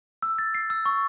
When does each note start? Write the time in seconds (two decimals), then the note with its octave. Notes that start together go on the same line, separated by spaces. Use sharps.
0.22 E6
0.38 A6
0.54 C7
0.70 E6
0.86 C#6